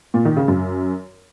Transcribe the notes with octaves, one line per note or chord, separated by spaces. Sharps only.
A#2
D#3
C#3
F#2